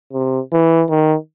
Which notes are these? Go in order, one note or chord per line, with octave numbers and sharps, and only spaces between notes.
C3
E3
D#3